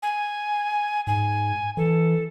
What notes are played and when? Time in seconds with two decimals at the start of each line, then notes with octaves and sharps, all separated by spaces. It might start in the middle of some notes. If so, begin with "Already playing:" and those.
0.03 G#5
1.07 G#2 G#5
1.77 E3 A4